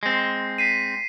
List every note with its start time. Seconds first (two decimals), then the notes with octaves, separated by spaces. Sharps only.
0.03 G#3 C4
0.58 B6 C7 D#7